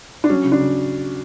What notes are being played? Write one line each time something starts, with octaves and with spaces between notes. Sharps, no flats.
D4
F#3 C#4
C#3
D4
C#3